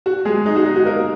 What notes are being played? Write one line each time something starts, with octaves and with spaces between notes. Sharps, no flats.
F#4
G#3 G#4
D#4
F#4
D#4
F#4
A#3 A#4